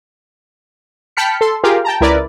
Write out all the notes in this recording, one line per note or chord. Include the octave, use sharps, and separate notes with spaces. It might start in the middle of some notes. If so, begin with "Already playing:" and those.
G5 A5 B5 F6 B6 C#7
A4 C6
F4 G4 G#4 A#4 F5 G5
G5 A5 A#5
C#2 E4 A#4 B4 D5